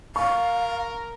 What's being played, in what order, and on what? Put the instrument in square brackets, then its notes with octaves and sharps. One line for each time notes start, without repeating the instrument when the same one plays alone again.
[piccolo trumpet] A#4 [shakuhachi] F5 [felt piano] C#6